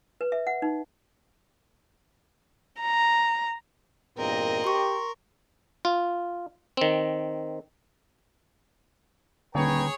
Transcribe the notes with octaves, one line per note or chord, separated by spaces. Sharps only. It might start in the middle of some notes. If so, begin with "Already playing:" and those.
B4
E5
F#5
D#4
A#5
E2 G2 A#2 C4 A#4 D#5
G4 C6 C#6
F4
D#3 C4
D#1 D3 G#4 B4 C#5 G5 A#5